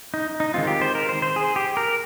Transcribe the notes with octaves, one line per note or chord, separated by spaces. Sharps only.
D#4
D#4
D#3 G#3 C4 F4
G4
C5
A#4
C5
C5
G#4
G4
A#4